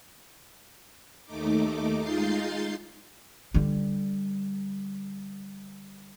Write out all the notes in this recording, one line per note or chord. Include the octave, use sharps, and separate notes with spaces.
D#2 A3 D#4 D6
G#3 D#4 F4 G6 A6 C7
D3 G3